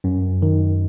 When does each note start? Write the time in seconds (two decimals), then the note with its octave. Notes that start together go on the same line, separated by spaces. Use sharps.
0.04 F#2
0.42 D#3